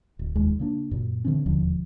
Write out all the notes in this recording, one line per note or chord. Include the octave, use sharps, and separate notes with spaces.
D1
F1 D#2 G#3
C#3 A#3 D4
F#2 A#2
D3 E3 C4 C#4
E1 D#2 D3 F3